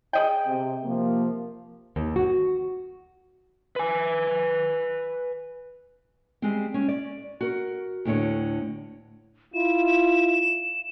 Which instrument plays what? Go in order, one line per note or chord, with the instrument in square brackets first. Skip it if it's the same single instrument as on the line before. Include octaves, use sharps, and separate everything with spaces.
[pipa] G#4 D#5 G5
[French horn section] C3
C3 F3 A#3
[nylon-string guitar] D#2
F#4
[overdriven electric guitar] B4 G#5
[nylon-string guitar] G3 G#3 C4
C#4
D5
F#4 A#4
D2 A2 D3 C#5
[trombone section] E4 F4 [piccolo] E7